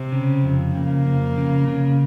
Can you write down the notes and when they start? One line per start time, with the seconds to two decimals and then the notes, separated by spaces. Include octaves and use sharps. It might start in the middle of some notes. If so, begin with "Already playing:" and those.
Already playing: C3
0.12 C#3
0.43 F2
0.75 C#3 A#3
1.06 F2
1.38 C#3
1.68 C#3